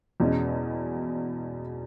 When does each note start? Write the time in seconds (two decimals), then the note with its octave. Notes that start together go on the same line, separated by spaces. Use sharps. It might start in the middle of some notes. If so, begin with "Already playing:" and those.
0.20 E2 B2 G#3 C#4